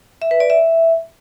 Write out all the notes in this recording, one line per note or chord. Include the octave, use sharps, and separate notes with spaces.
E5
B4
D5
E5